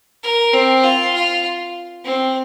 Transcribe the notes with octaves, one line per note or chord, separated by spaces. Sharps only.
A#4
C4
F4
F4
C4